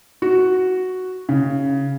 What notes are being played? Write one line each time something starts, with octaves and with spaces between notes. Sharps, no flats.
F#4
C#3